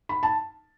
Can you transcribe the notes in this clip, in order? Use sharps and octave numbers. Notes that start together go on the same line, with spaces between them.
B5
A5